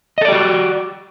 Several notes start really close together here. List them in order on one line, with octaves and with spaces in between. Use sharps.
D#5 A4 D5 G4 F#4